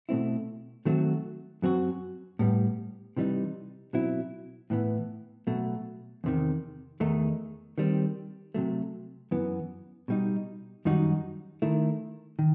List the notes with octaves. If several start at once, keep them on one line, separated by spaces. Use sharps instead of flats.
B2 A3 C4 E4
D#3 F#3 A3 C4 F#4
F#2 F#3 C4 F#4
A2 G3 B3
C3 E3 G3 D#4
B2 F#3 C4 E4
A2 E3 B3
B2 F#3 A3
E2 C3 D#3
E2 D#3 A3 D#4
D#3 G3 C4
C3 F#3 A3
F#2 E3 B3
B2 G3 D#4
F#2 D#3 G3 D#4 F#4
D#3 A3 E4
D#3